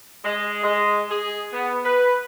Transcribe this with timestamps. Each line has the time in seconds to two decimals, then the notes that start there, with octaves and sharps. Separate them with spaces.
0.25 G#3
0.63 G#3
1.10 G#4
1.53 B3
1.84 B4